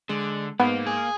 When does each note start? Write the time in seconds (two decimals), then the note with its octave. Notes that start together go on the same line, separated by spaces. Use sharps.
0.09 D3 G#3
0.59 G#2 A#3 B3
0.87 G#4